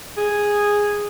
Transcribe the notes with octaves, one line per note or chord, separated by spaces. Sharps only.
G#4